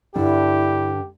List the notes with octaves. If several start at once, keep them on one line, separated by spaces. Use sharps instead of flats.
G2 D3 D4 E4 G4